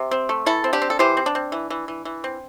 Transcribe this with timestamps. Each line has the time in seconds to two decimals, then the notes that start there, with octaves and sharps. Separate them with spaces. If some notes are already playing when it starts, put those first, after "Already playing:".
Already playing: C3
0.11 C4
0.29 A3
0.46 E3 E4 A4
0.64 C4
0.73 D4 G4
0.82 C4
0.90 A4
0.99 E3 G4 C5
1.17 C4
1.26 D4
1.35 C4
1.52 E3
1.70 E3
1.88 E3
2.05 E3
2.24 C4